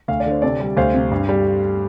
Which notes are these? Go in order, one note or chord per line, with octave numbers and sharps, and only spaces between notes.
D2 F5
D5
D3 C5
C3 A4 D5
G3
D2 C5 F5
C3
G2
G3